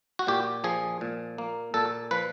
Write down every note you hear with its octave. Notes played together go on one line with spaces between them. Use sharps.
F#4
A#2 G4
F3 G#4
A#2
A#3
A#2 A4
F3 B4